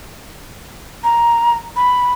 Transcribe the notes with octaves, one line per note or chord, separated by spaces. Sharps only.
A#5
B5